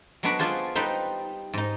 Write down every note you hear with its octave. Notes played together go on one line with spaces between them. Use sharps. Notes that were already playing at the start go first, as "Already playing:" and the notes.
F#3 G#3 B3 D4 F#4 B4
B3 D4 F4 G#4 C5
G3 D#4 B4 C5
G#2 D#4